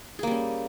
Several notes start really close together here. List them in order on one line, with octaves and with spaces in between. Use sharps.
G#4 A#3 G3 C#4